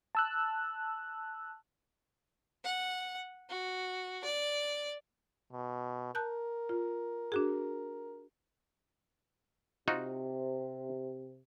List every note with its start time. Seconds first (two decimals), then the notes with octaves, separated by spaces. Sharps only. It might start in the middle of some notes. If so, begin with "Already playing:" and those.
0.15 A5 E6 F#6
2.64 F#5
3.50 F#4
4.24 D5
5.52 B2
6.15 A#4 A5 F#6 G6
6.69 F4
7.32 D4 F#4 G#4
9.88 C3 D#4 F4 F#4